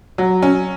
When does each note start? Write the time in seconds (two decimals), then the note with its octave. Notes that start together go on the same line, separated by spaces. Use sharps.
0.18 F#3
0.42 C#4